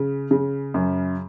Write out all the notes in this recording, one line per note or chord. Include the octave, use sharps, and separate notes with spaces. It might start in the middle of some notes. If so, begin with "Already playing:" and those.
Already playing: C#3
C#3
F#2